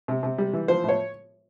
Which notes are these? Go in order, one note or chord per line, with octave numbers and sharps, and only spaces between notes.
C3
C3
G3
E3
F3 C5
A2 C#5